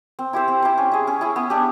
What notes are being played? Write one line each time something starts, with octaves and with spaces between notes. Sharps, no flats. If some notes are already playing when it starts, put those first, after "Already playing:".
C4
E4 G4 C5
C4
E4 G4 C5
C#4
E4 G#4
C#4
E4 G#4
B3
D4 G4